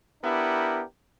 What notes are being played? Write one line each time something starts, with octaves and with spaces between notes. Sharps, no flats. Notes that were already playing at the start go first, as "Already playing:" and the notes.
B3 D4 E4 G4 A#4